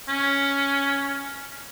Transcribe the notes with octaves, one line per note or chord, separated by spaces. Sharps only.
C#4